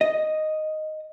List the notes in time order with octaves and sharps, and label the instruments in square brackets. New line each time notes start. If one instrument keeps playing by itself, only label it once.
[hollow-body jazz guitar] D#5